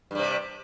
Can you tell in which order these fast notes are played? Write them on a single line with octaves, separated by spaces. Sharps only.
G2 G3 C3